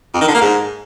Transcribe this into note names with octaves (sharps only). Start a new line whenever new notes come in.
F2
D#3
D3
A#3
G#2